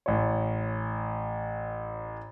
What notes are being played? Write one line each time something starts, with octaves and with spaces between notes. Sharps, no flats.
A1 C#5